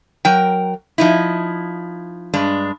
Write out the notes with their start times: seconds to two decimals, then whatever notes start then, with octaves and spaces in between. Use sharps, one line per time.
0.25 F#3 A#4 G5
0.98 F3 D#4 E4
2.34 G2 G#3 D4